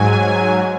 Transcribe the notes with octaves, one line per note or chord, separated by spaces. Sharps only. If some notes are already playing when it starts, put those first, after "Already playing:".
Already playing: G#2 F#3 G#5